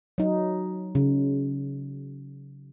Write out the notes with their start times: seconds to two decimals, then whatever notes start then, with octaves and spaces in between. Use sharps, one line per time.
0.18 F#3 D#4
0.95 C#3